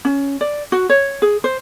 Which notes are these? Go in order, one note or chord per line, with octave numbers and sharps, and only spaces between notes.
C#4
D5
F#4
C#5
G#4
C5